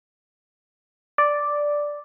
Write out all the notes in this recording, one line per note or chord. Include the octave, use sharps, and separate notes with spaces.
D5